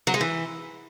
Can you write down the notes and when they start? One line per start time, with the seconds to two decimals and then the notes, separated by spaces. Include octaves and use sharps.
0.07 F#3
0.14 G#3
0.21 E3